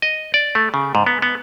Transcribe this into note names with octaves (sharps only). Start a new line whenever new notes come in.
D#5
D5
A3
C#3
G#2
B3
B3